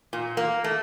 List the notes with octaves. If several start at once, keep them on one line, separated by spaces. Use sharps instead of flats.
A#2
A#3
A3